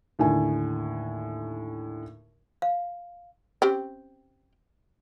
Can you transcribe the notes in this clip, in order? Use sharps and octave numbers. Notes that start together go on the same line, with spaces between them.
D#2 A2 D3 G#5
F5
C4 C#4 G4